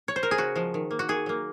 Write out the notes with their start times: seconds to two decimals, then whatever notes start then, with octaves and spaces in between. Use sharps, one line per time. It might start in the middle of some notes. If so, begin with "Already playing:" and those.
0.08 C#5
0.16 C5
0.23 A#4
0.31 G#4
0.38 C#3 F#4
0.56 F3 G#3
0.74 D#3
0.91 A#3
0.99 F#4
1.09 D#3 G#4
1.26 F#3 A#3